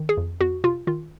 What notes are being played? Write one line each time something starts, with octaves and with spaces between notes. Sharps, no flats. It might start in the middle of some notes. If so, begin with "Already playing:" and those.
Already playing: D#3
G#4
F2
F2 F#4
C3 F4
D#3 F4